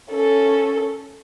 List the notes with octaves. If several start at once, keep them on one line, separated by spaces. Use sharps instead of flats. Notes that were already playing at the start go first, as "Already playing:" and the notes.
C#4 A4